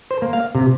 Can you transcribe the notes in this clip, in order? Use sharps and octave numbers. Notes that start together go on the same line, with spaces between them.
C5
A#3
F5
C3